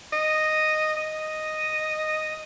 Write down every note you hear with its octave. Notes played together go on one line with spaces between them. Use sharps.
D#5
D#5